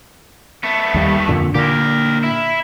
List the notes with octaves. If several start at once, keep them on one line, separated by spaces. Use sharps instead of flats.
A3 B3
D#2 G3
F2 A#2 D3
A#2 D3 A#3 G4 A#4
E4